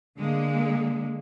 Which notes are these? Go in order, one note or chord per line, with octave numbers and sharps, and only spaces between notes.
D3 G#3 A#3